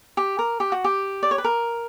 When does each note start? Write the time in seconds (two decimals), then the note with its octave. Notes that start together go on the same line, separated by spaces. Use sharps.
0.17 G4
0.39 A#4
0.60 G4
0.72 F#4
0.84 G4
1.23 D5
1.31 C#5
1.38 B4
1.44 A#4